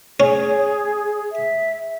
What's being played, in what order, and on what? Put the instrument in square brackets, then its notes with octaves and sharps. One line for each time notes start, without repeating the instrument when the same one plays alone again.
[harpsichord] C#4 [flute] G#4
[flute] E5